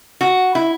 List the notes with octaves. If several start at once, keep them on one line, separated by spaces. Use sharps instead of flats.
F#4
E4